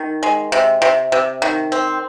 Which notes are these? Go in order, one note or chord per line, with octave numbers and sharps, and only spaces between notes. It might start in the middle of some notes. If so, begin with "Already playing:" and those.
Already playing: D#3
G#3
C3
C3
C3
D#3
C4